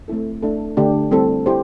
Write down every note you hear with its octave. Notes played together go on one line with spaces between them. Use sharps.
A3 C4 E4 A4
A3 D4 A4
D3 A3 D4 G4
G3 C4 E4 A4
E4 G4 C5